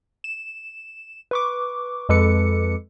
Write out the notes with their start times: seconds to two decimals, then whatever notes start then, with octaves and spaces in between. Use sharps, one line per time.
0.24 E7
1.31 B4 C#6 D6
2.09 F2 G#3 A4 B4 D6 C#7